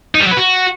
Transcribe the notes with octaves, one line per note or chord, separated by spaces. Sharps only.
D#4
G3
F#3
B4
F#4